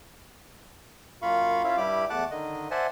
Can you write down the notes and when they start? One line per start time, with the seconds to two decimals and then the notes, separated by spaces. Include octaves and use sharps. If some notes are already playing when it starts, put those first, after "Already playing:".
1.22 F#2 A#3 F4 F5 B5 C#6
1.64 C#4 E4 F4 E5 F5
1.77 G2 G3 E4 G4 B5 D6
2.10 E2 A3 F#5 A5 D6 F#6
2.31 D3 D#3 D#5
2.71 C5 D5 E5 F#5 G#5 A5